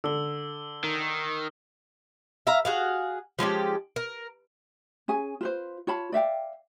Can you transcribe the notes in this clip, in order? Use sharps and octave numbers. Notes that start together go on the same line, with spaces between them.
D3 E6 G7
D#3
E5 F5 A#5
F#4 G#4 F5
F3 G#3 C#4 G4
A#4
C#4 G#4 G#5
F4 B4 C5
F4 C#5 A5 B5
D5 E5 F5 G5